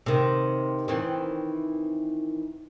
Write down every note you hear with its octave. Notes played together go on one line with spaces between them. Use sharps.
C3 D#3
D#3 E3 C4